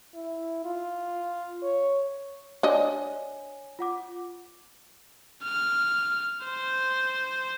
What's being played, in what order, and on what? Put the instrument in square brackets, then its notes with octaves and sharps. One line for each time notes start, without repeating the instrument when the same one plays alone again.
[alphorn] E4
F4
C#5
[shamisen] D4 D#5 [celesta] C#5 G#5
[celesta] F4 F#5 D6
[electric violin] F6
C5